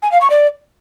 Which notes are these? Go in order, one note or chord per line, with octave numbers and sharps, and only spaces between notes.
G#5
F5
C#6
D5